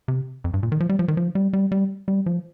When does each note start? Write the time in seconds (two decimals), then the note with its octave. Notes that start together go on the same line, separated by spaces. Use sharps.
0.08 C3
0.44 F2
0.54 G2
0.63 A#2
0.72 D#3
0.80 F3
0.89 G3
0.99 F3
1.08 D#3
1.17 F3
1.35 G3
1.53 G3
1.72 G3
2.08 G3
2.26 F3